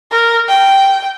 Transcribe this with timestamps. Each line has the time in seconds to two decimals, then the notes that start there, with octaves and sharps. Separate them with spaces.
0.12 A#4
0.49 G5